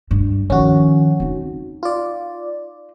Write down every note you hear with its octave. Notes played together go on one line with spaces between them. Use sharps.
G2
D#3 F3 C#4 F#4
C4 D#4
F4 D5